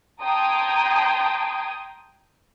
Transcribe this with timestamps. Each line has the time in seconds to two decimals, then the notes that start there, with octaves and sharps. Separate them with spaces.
0.21 G5 A5 A#5 C6 D#6 G#6